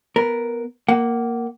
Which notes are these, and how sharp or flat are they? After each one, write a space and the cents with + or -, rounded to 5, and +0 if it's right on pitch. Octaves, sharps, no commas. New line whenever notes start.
B3 -5 A#4 +0
A#3 +0 F#5 +25